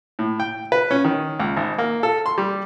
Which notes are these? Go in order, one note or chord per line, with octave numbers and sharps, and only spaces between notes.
A2
G5
B4
C#4
D#3
C#2
G#1
A#3
A4
C6
G3